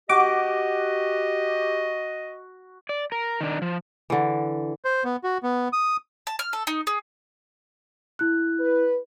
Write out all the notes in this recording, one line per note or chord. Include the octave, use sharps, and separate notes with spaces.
F#4 G4 D#5 D6
D5
A#4
D#3 D4
F3
D3 E3
C5
B3
F#4
B3
D#6
A5
F6
A4
D#4
G#4
E4 F#6
B4